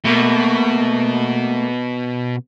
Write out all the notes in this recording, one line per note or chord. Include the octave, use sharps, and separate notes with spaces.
B2 A3 A#3